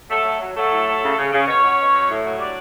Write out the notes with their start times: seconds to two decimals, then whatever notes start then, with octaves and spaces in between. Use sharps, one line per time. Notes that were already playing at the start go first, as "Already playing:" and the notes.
0.09 F#3 A3 A4
0.24 F#3
0.39 F#3
0.54 F#3 A3 A4
0.70 A2
0.86 F#3
1.02 C#3
1.17 C#3
1.32 C#3
1.46 B2 C#4 C#5
1.62 F#3
1.78 B2
1.93 F#3
2.09 A2
2.24 F#3
2.38 G3 D4 D5